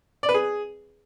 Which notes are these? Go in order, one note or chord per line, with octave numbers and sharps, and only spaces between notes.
D5
B4
G#4